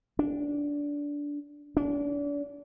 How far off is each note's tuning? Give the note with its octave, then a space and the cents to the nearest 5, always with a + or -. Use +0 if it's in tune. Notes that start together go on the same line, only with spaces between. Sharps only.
D4 -15
D4 -35